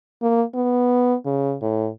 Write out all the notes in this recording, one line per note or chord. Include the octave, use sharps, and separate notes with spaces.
A#3
B3
C#3
A2